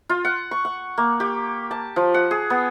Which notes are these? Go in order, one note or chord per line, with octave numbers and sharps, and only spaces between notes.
F4
F#5
C#6
F#5
A#3
G4
A5
F3
F#5
G#4
B3